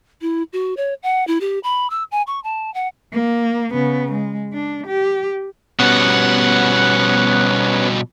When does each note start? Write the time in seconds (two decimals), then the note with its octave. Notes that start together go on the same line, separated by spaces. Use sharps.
0.22 E4
0.53 F#4
0.77 C#5
1.03 F#5
1.27 E4
1.41 G4
1.64 B5
1.90 E6
2.12 G#5
2.27 C#6
2.44 A5
2.74 F#5
3.13 A#3
3.71 C#3 B3
4.12 G#3
4.53 D4
4.87 G4
5.79 B2 G3 B3 C#4 F#5